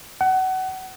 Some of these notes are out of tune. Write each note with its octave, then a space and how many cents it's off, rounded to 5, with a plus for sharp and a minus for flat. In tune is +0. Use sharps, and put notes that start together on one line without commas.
F#5 +25